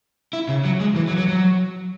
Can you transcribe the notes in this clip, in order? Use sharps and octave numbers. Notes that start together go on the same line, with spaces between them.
E4
C#3
F#3
G#3
E3
F#3
F#3
F#3